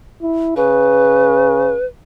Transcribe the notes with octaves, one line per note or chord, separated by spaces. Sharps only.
E4
C#3 B4